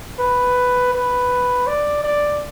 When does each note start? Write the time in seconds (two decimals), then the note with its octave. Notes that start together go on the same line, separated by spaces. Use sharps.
0.19 B4
0.93 B4
1.67 D5
2.04 D5